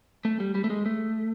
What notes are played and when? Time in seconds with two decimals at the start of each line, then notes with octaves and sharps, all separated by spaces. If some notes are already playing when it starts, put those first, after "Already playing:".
0.25 A3
0.40 G3
0.55 G3
0.64 A3
0.70 G#3
0.86 A3